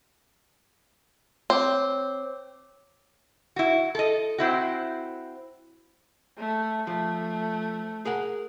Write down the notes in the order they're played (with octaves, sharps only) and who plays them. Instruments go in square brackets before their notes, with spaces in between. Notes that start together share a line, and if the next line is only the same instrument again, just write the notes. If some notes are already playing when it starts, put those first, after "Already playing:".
[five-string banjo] C4 [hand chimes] C#5 D6
[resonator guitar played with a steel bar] E4 F#4
A4 D#5
C4 E4 F#4
[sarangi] A3
[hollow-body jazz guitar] F3 [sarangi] A3
[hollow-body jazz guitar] G#4 A#4 F#5